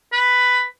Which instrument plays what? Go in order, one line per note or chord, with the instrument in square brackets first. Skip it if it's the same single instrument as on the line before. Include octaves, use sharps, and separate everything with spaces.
[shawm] B4